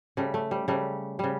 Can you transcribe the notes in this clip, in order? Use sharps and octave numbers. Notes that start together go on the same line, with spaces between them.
C#3 G3 A3
A3
G3
C#3 G3 A3
C#3 G3